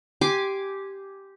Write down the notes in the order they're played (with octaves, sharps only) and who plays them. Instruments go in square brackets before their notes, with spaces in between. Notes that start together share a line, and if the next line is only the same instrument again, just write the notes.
[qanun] G4 G#5 C6 D6